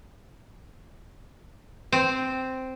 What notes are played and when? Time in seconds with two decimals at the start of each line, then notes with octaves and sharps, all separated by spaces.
1.92 C4